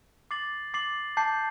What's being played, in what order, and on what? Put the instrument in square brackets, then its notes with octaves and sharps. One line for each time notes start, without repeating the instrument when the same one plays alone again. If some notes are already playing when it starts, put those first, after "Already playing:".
[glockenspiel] D6 A6 C7 F#7
D6 A6 C7 F#7
A5 D6 G6 C7